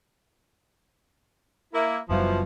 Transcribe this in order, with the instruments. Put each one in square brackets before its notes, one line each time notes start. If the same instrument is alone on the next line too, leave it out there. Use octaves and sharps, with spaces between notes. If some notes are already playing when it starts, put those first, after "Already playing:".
[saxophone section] A#3 E4
[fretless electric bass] F#1 F#2 G3 [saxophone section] B2 E3 F3